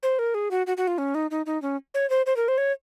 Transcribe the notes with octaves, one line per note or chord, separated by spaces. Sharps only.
C5
A#4
G#4
F#4
F#4
F#4
F4
C#4
D#4
D#4
D#4
C#4
C#5
C5
C5
A#4
C5
C#5